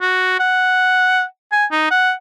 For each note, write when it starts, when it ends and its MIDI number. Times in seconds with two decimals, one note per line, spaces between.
0.01 0.38 66
0.40 1.23 78
1.52 1.65 80
1.71 1.86 63
1.91 2.12 78